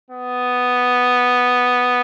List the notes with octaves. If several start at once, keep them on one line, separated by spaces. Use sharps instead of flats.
B3